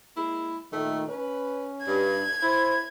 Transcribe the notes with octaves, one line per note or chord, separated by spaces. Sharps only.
G#3 A#3 E4
A#2 D#3 A3
C#4 B4
G2 G#6
E4 C5